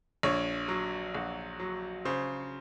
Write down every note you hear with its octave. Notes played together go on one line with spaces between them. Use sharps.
A#1 C#5
F#3
A#1 F#4
F#3
C#3 C5